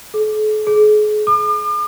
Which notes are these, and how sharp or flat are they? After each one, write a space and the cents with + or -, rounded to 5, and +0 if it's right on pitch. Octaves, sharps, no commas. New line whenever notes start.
A4 -45
G#4 +35
D6 +45